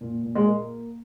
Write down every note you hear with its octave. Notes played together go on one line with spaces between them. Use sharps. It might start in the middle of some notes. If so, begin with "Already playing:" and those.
A#2
A#2
G#3
A#3